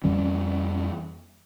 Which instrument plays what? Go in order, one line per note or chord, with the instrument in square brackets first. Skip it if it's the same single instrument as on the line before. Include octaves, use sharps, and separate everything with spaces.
[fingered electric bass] F2 E3 G3 C#4